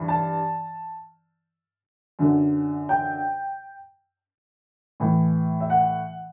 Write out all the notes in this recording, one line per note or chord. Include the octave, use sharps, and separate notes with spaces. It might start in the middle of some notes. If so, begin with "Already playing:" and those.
Already playing: G2 E3
A5
F#2 D3
G5
A2 E3
E5
F#5